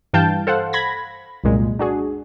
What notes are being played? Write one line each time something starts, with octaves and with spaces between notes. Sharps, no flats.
G2 E3 F5 G5 A5 G6
A4 C5 F5 F#5
B5 G#6 A#6
C2 F#2 A#2 G#3
D4 F#4 G#4